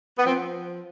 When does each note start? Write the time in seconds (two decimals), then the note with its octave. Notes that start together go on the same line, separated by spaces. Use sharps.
0.18 B3
0.25 F3 C4